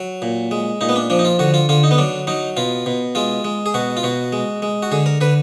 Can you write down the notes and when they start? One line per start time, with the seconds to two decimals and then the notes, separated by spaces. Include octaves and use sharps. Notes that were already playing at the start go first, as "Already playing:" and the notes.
Already playing: F#3
0.22 A#2
0.51 G#3
0.81 A#2 D#4
0.89 B3
0.96 D4
1.10 F3 D4
1.19 D#4
1.25 F4
1.39 D3 F#4
1.54 F4
1.69 D3 F4
1.83 D#4
1.91 B3
1.98 F#3 D4
2.27 F#3 D#4
2.57 B2 F4
2.86 B2
3.15 G#3 F4
3.45 G#3
3.66 G#4
3.74 B2 F#4
3.97 F4
4.03 B2 F#4
4.33 G#3
4.62 G#3
4.83 F#4
4.91 D3 G#4
5.06 A#4
5.21 D3 B4